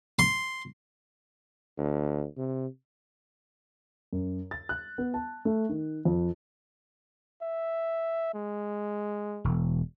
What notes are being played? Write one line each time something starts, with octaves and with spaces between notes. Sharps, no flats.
C6
D2
C3
F#2
A6
F#6
B3
A5
A3
D#3
F2
E5
G#3
E1